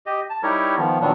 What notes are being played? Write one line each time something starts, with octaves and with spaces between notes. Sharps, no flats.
G4 D#5
A5
G3 D#4 E4 G4 A#4 C#5
D#3 F3 B3
A#2 D#3 F#3 G3 B3 D4